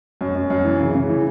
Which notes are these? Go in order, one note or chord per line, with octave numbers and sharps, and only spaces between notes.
F#2
F#2
F#2
E3
C#3
C#3
E3